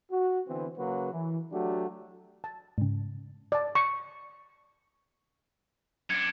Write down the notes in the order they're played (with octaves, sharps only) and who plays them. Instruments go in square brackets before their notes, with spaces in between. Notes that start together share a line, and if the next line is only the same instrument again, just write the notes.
[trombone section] F#4
D3 E3 B3 C4
C#3 F#3 A#3 F#4 B4
E3
F#3 A3 D4 F#4 G4
[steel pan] A5
[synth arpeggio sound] G#2 C#3
[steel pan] D5 A5
C#6
[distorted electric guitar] F#2 D4 [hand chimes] G#6 C#7